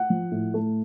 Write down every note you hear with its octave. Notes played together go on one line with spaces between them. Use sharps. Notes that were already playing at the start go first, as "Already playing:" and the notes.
Already playing: F#5
F3
A2
A3